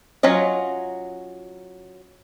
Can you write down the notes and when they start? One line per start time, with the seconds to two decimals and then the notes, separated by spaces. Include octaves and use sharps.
0.23 F#3 C#4 F4 D#5